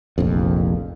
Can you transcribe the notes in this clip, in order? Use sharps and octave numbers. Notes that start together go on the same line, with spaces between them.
F1 A#1 F2